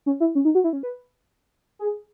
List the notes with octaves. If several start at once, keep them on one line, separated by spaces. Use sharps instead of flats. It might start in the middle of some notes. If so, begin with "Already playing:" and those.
C#4
E4
C#4
D#4
F#4
E4
C#4
B4
G#4